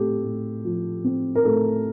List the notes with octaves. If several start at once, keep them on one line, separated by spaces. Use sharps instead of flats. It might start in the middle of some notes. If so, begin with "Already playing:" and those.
Already playing: A2 C4 G4 A4
A2
F3
C4
A#4
A2 A4